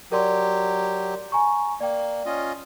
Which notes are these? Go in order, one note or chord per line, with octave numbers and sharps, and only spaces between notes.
F#3 G4 A#4 D5 C6
G#5 A#5 C#6
A#3 D5 G5
C#4 F4 D#5